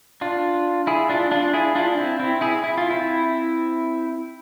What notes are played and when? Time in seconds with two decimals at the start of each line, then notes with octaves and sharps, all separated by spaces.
0.21 D4 F4
0.87 E4 G#4
1.09 D4 F4
1.31 D4 F4
1.53 E4 G#4
1.75 D4 F4
1.97 C4 E4
2.19 C4 E4
2.41 E4 G#4
2.64 E4
2.78 F4
2.91 C4 E4